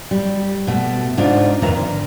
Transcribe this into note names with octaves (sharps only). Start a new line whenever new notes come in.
G3
B2 A3
G#2 C#3 D4 D#4 F4
F2 D#3 F4 B4 E5 A#5
D3